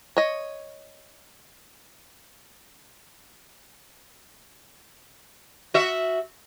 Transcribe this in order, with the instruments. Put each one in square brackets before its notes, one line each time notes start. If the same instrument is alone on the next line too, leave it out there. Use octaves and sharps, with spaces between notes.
[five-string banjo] C#5 D#5
[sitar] F#4 E5